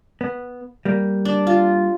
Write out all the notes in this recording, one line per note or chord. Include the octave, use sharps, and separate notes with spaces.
B3
G3 A#3
D4
F4